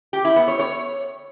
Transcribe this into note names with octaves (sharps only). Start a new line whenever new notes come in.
G4
E4
B3
C#5
C#5